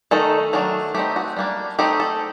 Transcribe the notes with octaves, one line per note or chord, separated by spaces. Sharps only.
D#3 A3 D#4 A4
D#3 F#3 A3 D4
A3 C4 D#4 G4
F#4
G3 A#3 D4
A3 C4 D#4 G4
A4